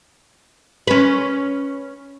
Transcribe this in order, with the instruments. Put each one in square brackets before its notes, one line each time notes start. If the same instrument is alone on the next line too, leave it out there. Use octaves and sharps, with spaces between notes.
[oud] C#4 B4